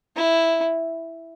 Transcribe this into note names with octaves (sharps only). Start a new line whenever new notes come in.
E4